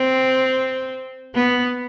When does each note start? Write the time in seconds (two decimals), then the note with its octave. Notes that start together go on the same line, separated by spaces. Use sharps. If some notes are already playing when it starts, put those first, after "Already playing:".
Already playing: C4
1.35 B3